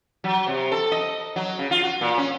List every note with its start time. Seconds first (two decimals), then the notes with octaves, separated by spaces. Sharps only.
0.24 F#3
0.48 C3
0.72 A4
0.92 D#5
1.36 F#3
1.59 C#3
1.71 F4
1.83 F#4
2.01 A#2
2.18 C#4